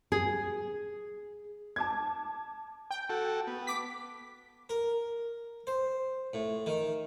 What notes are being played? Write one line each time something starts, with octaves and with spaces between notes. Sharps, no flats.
G#4
A5 D6 G#6
G5
F#4 A4
B3
D6 B6
A#4
C5
A2
D#3